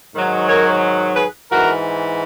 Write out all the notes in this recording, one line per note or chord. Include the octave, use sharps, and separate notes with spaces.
G#2 D#3 F#3
A#4 C#5
G#4 B4
G#2 E3 F#4 A#4